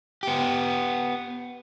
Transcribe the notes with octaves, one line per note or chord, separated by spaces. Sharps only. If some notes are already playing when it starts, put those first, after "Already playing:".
B3 G4